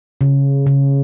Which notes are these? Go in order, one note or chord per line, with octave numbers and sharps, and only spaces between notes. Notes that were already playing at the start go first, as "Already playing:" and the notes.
C#3
C#3